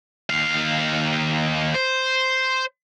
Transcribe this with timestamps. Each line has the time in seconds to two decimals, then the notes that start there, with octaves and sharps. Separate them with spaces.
0.30 D#2 F5
1.74 C5